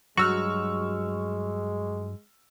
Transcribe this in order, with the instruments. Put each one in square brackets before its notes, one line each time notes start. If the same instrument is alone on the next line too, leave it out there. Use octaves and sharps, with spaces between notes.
[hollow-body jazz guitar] G2 F#3 [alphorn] G#3 [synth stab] F#4 [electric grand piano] C#6 E6 F6